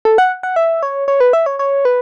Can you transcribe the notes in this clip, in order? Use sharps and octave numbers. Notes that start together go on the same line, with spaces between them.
A4
F#5
F#5
E5
C#5
C#5
B4
E5
C#5
C#5
B4